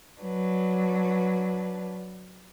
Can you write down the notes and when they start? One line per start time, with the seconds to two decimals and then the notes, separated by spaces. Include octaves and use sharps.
0.21 F#3 D4 B4